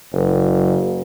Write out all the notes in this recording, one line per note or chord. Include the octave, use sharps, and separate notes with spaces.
F#1